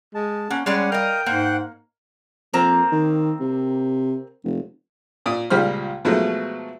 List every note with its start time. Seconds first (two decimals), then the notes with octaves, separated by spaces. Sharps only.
0.15 G#3 A5
0.50 A#3 C#4 F#5
0.66 G3 G#3 C#4 G#4 D5 F#5
0.92 A#4 D#5 F5 G5 A#5
1.26 G#2 A#3 C5 F#5 F#6
2.54 F2 A#3 C4 A#5
2.92 D#3
3.40 C3
4.44 F1
5.26 A#2 D5 D#6
5.50 C#2 A#2 G3 G#4 C5 F6
6.05 B2 F3 F#3 G#3 A3